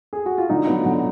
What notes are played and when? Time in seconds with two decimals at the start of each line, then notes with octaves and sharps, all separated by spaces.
0.13 G#4
0.26 F#4
0.38 F4
0.49 D3 D#4
0.67 F#3 B3
0.85 D3